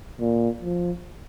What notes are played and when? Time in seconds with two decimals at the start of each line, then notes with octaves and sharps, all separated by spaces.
0.20 A#2
0.62 F3